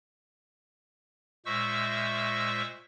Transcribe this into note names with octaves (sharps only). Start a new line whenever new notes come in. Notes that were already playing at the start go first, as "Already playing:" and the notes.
A#2 G#3 C5 E5 C#6 E6